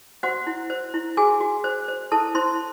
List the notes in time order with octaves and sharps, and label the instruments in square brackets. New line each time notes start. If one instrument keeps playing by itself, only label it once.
[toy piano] F#4 C5 F#5
E4
C5
E4
F#4 G#4 G#5
F#4
C5
C5
E4 A4 A5
E4 C5 C6